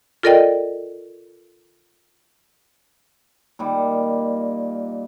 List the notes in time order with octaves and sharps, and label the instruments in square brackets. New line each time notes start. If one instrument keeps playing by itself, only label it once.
[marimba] F4 A4 A#4 D5 D#5 G5
[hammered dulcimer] A#2 D#3 G3